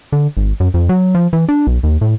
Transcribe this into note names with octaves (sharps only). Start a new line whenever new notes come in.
D3
G#1
F#2
F2
F#3
F3
E3
D4
B1
D#2
A2